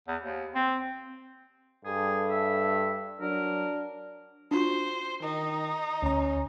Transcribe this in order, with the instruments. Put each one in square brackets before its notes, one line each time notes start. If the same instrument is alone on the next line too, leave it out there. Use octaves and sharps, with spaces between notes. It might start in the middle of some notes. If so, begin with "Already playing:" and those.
[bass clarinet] E2
D#2
C4
[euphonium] G2 [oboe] G#4 [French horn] A4
[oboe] E5
[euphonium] F#3 [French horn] D4 [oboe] A#4
[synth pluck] D4 F4 F#4 [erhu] C5
[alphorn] D#3 [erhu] D#4
[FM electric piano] D2 A#5 [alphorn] C#4